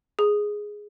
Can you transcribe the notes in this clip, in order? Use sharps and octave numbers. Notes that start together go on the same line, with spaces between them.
G#4